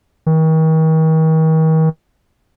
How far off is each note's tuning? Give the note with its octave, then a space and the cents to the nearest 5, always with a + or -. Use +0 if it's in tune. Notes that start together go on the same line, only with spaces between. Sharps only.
D#3 +40